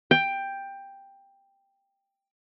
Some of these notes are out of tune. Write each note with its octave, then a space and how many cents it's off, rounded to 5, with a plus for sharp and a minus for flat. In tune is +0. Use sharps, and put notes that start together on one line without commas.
G5 +10